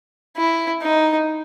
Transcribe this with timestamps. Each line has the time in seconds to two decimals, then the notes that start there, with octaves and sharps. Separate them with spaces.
0.37 E4
0.82 D#4